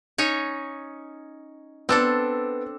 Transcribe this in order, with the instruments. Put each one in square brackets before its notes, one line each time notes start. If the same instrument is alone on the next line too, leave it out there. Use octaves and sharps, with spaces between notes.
[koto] C#4 D#4 C#5
[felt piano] B3 E6 [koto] C4 D4 A4